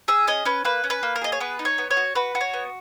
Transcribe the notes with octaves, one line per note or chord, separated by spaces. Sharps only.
G#4 E5
C#4 D#5
C#4 B4
A#3 B4
C#4
B4
A#3
A#4
G#4 D#5
C#5
B3 B4
D#4
C#5
B3
C#5
F#4
F#4 B4
F#4
C#5
B3